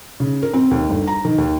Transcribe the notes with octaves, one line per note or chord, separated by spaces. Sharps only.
C#3
A#4
C4
D#2
G1
A#5
D#3
D#2